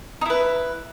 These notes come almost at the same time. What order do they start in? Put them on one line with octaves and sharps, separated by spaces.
D#4 E4 B4